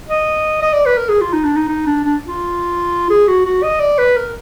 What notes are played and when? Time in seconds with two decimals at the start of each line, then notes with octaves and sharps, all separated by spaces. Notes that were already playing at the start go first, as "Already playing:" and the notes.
0.09 D#5
0.62 D#5
0.74 D5
0.86 B4
0.97 A#4
1.09 G#4
1.21 F4
1.33 D#4
1.44 D4
1.56 D#4
1.68 D#4
1.87 D4
2.04 D4
2.28 F4
3.10 G#4
3.28 F#4
3.46 F#4
3.63 D#5
3.80 D5
3.98 B4
4.17 A#4